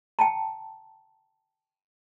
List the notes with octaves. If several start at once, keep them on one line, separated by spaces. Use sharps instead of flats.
G5 A5 A#5